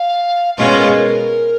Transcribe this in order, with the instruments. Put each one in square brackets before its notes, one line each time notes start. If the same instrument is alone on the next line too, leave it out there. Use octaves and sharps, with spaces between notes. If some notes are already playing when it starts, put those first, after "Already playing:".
Already playing: [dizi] F5
[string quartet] B2 G#3 C#4 F4 [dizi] D#5
[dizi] C#5
A#4
G#4
A#4